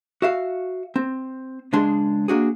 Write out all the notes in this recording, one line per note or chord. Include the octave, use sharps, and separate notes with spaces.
F#4 E5 F5
C4
C#2 G#3 D4 G#4 C6
A#3 D4 F#4 G#4